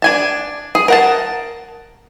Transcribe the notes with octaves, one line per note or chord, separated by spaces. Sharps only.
D4 G#5 A5
G#4
A#4 F#5 A5